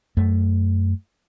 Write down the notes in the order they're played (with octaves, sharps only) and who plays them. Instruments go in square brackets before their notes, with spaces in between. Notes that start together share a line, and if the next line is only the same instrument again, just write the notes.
[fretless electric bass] F#2 A3